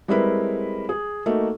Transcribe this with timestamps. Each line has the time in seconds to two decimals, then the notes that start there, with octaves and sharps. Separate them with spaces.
0.08 G3 G#3 C4 E4 A#4 B4
0.89 G#4
1.26 A3 A#3 D#4 F#4